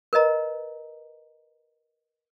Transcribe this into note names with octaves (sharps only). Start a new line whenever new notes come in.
A#4 B4 D#5 A#5